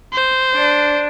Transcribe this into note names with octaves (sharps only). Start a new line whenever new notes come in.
C5
D4